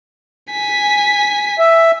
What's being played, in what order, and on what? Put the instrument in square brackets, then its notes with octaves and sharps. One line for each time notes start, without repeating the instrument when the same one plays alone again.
[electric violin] G#5 B6
[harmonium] E5